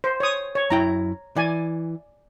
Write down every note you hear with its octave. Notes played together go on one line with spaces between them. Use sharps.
C5
C#5 D#6
C#5
F#2 E4 G5 A#5
E3 D5 G#5